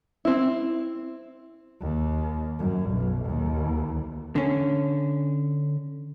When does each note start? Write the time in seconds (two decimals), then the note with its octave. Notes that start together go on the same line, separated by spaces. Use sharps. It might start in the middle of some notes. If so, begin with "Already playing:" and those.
0.25 C4 E4
1.81 D#2
2.59 F#2
2.91 B1
3.26 D#2
4.36 D3 C#4